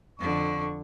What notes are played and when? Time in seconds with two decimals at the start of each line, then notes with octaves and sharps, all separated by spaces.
0.19 F2 D3 C#6